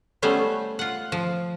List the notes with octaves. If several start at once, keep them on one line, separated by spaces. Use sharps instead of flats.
G3 A3 B3 C#4 C5
F4 F#5
F3